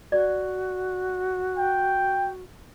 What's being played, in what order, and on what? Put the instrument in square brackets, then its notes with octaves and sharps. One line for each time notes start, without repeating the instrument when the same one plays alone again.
[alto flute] F#4 [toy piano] D5
[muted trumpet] G5